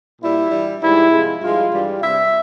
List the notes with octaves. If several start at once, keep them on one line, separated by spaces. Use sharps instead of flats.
A#2 G3 E4
G2 E3 G3
G#2 E3 G3 E4
C3 F3 G#3
G2 F3 G#3 F4
G2 E3 G3
C3 G3 E5